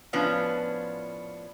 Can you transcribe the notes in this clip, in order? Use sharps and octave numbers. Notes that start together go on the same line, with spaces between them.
A2 F3 B3 C#4 D4 F4